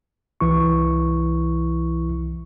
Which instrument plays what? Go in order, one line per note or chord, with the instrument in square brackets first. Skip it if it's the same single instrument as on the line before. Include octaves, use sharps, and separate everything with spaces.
[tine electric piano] C2 E3 E4 C#6